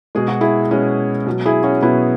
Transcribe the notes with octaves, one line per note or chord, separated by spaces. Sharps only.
B2 G#3 G#4
F#4
E4 G#4
B2 G#3 C#4 F#4
B2 F#3
E4 G#4
C#4 F#4
B2 F#3 B3 E4